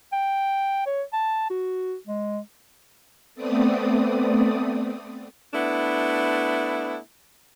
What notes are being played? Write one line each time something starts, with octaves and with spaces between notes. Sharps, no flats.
G5
C#5
A5
F#4
G#3
A3 B3 C4 D5 D#6
A3 B3 D4 E4